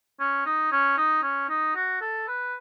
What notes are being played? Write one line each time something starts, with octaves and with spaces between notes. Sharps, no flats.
C#4
D#4
C#4
D#4
C#4
D#4
F#4
A4
B4